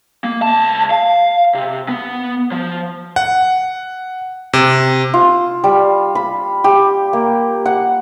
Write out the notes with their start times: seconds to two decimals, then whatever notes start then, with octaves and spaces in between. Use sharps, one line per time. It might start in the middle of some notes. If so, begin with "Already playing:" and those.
0.24 A#3
0.42 C#2 A5
0.91 F5
1.54 C3
1.88 B3
2.52 F3
3.16 F#5
4.53 C3
5.14 F4
5.64 G3
6.15 B5
6.64 G4
7.13 A#3
7.66 F#5